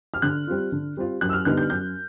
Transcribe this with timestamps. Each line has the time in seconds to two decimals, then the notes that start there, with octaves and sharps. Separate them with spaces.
0.14 F6
0.22 D3 F#6
0.47 G3 C4 F4
0.72 D3
0.97 G3 C4 F4
1.21 F#2 F#6
1.29 E6
1.33 F6
1.45 D3 G3 B3 D#4 F#6
1.57 G6
1.70 F#2 G6